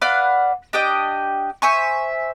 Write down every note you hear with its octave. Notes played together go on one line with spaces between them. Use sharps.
B4 D5 F5 F#5
D4 G4 D#5 G5
C5 E5 G#5 C#6